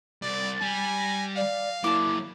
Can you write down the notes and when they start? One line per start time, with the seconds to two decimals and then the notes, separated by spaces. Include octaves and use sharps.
0.22 C2 D5 A6
0.61 G3 G#5
0.96 A#6
1.37 D5 F5
1.84 F#3 A#3 E4 A5 D6